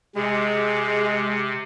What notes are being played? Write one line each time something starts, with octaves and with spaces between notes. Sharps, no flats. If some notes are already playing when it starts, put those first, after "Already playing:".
C3 G#3